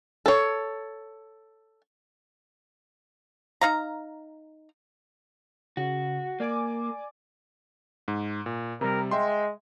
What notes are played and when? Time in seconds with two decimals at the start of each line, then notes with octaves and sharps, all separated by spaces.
0.26 A4 C#5
3.61 D#4 F5 A#5
5.77 C#3 F#4
6.40 A#3 D5 G#5 D6
8.08 G#2
8.46 A#2
8.81 C3 G3 A#4
9.11 G#3 E5 G5 C6